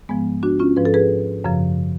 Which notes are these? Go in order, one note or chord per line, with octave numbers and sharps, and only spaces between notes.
G#2 F3 G#3 B3
D4 F#4
C#4 F4
G#2 F3 B4
A4
G#4 B4
F#2 C#3 F3